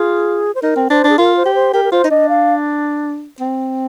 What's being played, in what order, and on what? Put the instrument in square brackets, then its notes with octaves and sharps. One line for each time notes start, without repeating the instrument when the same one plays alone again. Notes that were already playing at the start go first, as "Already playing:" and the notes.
Already playing: [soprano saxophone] F4 [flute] G#4
[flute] C5
[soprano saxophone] D#4 [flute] A#4
[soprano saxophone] C4
[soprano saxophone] D4 [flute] C5
[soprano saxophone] D4
[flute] G#4
[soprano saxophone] F4 [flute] A#4
[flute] C5
[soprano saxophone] G4
[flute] C5
[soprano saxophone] G4 [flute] A#4
[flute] A#4
[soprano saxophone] F4 [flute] C5
[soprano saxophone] D#4
[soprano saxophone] D4 [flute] D#5
[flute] F5
[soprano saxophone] C4